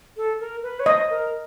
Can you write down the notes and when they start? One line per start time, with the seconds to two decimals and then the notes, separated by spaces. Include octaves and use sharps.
0.17 A4
0.40 A#4
0.63 B4
0.80 C#5
0.86 C5 D#5
1.10 A#4